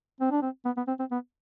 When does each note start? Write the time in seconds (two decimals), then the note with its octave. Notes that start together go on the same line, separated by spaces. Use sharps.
0.20 C4
0.31 D4
0.42 C4
0.65 B3
0.77 B3
0.88 C4
0.99 C4
1.11 B3